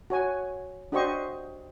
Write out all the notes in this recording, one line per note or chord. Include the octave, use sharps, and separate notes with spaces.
F#4 C#5 G#5
D4 F#4 G4 C5 D#5 C#6